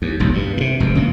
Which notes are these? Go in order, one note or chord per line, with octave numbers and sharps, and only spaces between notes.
D#2
E1 B1 F#2
G2
A2 C3
F1 F#2
C#3 E3 A3 A#3